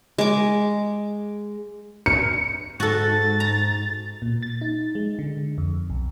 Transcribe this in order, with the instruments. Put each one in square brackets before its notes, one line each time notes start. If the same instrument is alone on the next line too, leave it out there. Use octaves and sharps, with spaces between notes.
[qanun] G#3 D6
[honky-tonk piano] C#7
[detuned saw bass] G#2 [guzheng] F#4 A4 [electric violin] A6
[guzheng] A#5
[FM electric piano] A#2
A6
D#4
G#3
D3
F2
B1